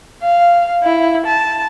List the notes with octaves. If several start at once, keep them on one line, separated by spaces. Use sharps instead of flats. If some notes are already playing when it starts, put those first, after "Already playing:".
F5
E4
A5